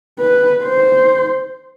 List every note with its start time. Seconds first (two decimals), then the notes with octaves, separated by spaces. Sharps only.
0.19 B4
0.64 C5